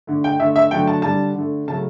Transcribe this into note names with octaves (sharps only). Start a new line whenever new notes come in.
D3 A3
G5
D3 A3 E5
E5
D3 F#3 A3 G5
A5
D3 G3 A5
D3 A3
C#3 F#3 A3 A5